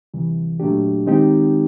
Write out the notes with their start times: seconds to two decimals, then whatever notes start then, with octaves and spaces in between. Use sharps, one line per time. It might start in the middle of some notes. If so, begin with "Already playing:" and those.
0.14 D2 C3 E3 G3
0.60 A#2 F#3 A3 D4 G4
1.06 D#3 G#3 C4 D#4 G4